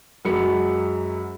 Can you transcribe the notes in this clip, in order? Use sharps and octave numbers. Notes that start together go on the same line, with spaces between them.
F#2 F#3 G#3 B5 C#7